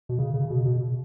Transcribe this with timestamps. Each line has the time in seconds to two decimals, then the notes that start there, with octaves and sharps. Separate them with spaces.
0.09 B2
0.19 C#3
0.34 C#3
0.50 B2
0.65 B2